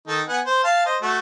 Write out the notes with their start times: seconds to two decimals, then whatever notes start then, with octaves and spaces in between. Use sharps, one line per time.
0.08 D#3 D#4 A4
0.29 B3 F#5 G#5
0.46 C5
0.64 F5 A5
0.86 C5 D#5
1.02 A3 F#4